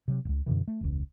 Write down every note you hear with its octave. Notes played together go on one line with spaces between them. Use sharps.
C3 F#3
D1 C#2
F#2 B2 D3 E3
A3
E1 C#2